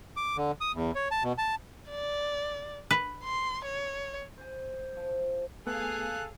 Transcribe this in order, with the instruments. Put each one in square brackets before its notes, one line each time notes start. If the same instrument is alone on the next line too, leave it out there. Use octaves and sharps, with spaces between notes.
[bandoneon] D6
D3
D#6
E2
C#5
A5
B2
A5
[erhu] D5
[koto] B4
[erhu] C6
C#5
[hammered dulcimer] C5 G#5
F3
[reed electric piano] A3 B3 [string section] G#4 F5 [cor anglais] A4 [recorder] F#6